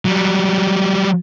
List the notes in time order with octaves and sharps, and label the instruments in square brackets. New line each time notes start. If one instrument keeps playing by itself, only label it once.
[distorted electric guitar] F#3 G3